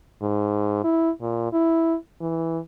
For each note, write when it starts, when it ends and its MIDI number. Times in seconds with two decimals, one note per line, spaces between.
0.22 0.80 44
0.84 1.10 64
1.22 1.52 46
1.53 1.95 64
2.21 2.59 52